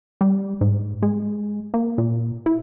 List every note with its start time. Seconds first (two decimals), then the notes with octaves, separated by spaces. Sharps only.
0.21 G3
0.61 G#2
1.02 G#3
1.74 A#3
1.98 A#2
2.46 E4